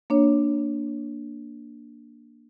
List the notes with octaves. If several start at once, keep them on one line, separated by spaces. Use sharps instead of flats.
A#3 D4 C#5